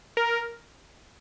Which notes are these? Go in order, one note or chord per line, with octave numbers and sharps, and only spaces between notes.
A#4